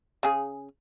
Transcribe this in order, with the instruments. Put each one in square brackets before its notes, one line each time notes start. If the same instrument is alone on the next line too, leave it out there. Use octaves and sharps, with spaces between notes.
[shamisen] C#3 G#4